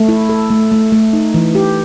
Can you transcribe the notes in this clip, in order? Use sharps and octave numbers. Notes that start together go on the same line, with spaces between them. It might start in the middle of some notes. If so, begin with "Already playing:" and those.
Already playing: A3
E4
A4
A3
A3
A3
D#4
E3
G4